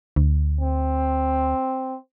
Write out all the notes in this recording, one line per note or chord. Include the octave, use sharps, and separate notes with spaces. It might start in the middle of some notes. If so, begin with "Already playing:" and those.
D2
C4